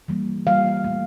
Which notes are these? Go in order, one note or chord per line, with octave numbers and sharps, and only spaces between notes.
E3 G3 A#3
E3 G3 A#3 F5
A#2 A3